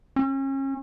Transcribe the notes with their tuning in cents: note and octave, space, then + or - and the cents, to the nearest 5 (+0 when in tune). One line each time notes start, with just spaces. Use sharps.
C#4 -35